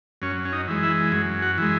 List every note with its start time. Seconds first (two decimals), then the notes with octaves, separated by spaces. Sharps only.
0.22 F#2 C#4
0.45 C#4
0.52 D#4
0.67 E3 G#3
0.83 E4
1.12 F#2 G#4
1.42 F#4
1.58 E3 G#3